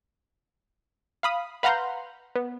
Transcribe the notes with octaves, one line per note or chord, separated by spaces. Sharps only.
F5 B5 D#6
B4 F5 F#5 A#5 C6 G6
B3